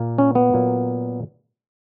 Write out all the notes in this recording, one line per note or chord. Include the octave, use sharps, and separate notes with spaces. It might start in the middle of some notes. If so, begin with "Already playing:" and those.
Already playing: A#2 A#3
C#4
B3
A#2 F#3 A#3